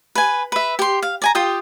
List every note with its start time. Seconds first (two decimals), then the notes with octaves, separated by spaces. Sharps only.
0.15 B4 G#5
0.52 B4 E5
0.79 G4 C6
1.02 F5
1.22 D5 G#5 A#5
1.35 F4 G4 G5 D#6